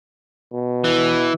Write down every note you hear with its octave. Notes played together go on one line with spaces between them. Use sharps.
B2
E3